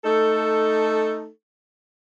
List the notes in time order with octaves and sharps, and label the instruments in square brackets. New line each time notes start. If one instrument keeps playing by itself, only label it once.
[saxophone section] A3 D#4 A4